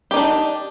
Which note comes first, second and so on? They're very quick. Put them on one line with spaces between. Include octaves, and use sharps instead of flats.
G4 D#4 D4